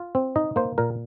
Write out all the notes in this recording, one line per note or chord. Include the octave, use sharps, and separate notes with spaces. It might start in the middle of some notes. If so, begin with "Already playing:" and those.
Already playing: F4
C4
D#4 D#5
A#3 C5
A#2 A#4